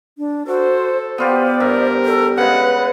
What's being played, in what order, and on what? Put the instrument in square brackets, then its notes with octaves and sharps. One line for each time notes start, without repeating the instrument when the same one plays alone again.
[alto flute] D4
[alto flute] F#4 [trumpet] A4 [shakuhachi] C5
[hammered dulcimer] B3 F4 G4 [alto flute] C5 [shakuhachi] D5
[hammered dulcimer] G2 E5 [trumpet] A#4
[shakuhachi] A4
[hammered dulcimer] C#3 G#3 [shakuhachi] B4 [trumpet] F#5